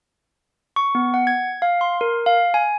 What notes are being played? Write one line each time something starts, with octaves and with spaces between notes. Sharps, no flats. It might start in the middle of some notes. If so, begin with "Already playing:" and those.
C#6
B3
F#5
G#6
F5
C6
A#4
F5
G#5